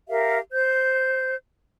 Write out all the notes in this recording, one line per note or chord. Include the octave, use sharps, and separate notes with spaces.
G4 A#4 E5 F5
C5 G6